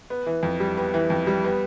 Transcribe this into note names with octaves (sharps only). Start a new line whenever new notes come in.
B3
E3
F2
G3
B3
E3
F2
G3
B3